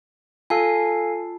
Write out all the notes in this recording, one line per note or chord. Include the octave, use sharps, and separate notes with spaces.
F4 A4 F5 G#5 A5